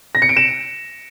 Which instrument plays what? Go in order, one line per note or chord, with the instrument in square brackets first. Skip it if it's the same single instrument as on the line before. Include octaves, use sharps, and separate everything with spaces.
[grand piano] A#6
C#7
D7
E7